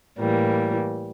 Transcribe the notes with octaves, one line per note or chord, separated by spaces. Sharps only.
A2 E3 G3 A#3